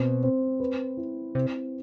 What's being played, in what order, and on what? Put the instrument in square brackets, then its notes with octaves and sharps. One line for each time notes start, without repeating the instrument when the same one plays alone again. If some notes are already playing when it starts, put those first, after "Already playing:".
Already playing: [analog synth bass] B2 [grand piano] C4
[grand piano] C4
B4
E4
[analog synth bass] C3 [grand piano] C4